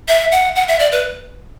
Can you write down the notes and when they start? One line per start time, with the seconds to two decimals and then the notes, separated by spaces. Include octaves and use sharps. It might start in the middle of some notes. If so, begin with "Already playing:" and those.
0.08 E5
0.32 F#5
0.56 F#5
0.68 E5
0.79 D5
0.92 B4